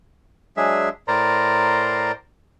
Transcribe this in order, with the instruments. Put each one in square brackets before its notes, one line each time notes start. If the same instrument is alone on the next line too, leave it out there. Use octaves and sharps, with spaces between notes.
[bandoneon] F#3 G#3 D4 G#4 E5
A2 A#4 C5 D5 A#5 C6